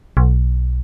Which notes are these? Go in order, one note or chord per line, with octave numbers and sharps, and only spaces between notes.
B1